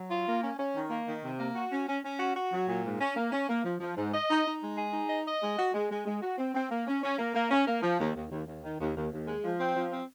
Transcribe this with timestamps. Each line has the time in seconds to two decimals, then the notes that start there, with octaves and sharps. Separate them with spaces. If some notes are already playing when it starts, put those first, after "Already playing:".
Already playing: F#3
0.10 F4
0.26 A#3
0.42 C#4
0.58 C#4
0.75 D#3
0.90 A#3
1.07 D#3
1.23 C3
1.39 A#3
1.56 F#4
1.71 C#4
1.88 C#4
2.03 C#4
2.19 F#4
2.36 F#4
2.51 F#3
2.67 A#2
2.84 G#2
3.00 C#4
3.16 A#3
3.32 C#4
3.48 A#3
3.64 F3
3.80 F3
3.96 G#2
4.13 D#5
4.29 D#4
4.45 D#4
4.61 G#3
4.78 G#4
4.92 D#4
5.09 D#5
5.25 D#5
5.42 G#3
5.57 F#4
5.73 G#3
5.90 G#3
6.05 G#3
6.21 F#4
6.38 C4
6.54 C4
6.70 A#3
6.87 C#4
7.03 C#4
7.18 A#3
7.34 A#3
7.51 C#4
7.67 A#3
7.82 F3
7.99 D#2
8.15 D#2
8.30 D#2
8.47 D#2
8.63 D#3
8.80 D#2
8.96 D#2
9.12 D#2
9.27 G#3
9.44 F3
9.60 C4
9.75 F3
9.92 C4